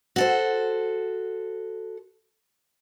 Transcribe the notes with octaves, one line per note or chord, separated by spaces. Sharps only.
F#4 A4 C5